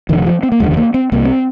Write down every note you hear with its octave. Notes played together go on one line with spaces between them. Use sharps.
F1 F2 D3 D#3
F3
C4
A#3
F1 D#2 D3 G#3
A#3
C4
C2 C3 A#3
C4